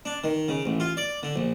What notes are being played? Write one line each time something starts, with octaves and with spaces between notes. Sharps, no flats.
D4
D#3
C#3
A1
F4
D5
D3
A#1